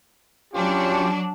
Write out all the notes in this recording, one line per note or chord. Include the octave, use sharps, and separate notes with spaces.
F#3 C#4 D4 F4 G4